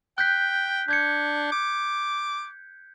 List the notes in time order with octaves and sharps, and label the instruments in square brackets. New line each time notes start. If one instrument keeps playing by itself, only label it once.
[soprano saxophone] G5 [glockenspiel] F#6 G6 B6
[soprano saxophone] D4 [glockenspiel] G6 G#6 C#7
[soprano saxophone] D6